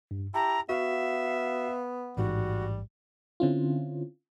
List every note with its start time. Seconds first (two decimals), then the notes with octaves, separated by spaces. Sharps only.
0.11 G2
0.34 E4 G4 A5 A#5
0.69 B3 F#4 E5 F5
2.17 A1 G#2 G3 F#4
3.40 D3 C4 C#4 E4 F4